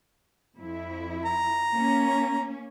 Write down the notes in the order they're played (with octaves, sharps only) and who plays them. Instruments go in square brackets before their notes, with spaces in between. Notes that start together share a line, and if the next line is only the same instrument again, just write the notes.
[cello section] F2 E4
[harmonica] A#5
[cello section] A#3 C#4